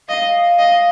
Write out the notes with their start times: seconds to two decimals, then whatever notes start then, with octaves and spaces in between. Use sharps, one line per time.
0.08 D#5 F5
0.59 D#5